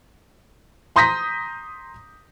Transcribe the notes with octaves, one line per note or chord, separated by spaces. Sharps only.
A#5 C6 D#6 G6 A#6 B6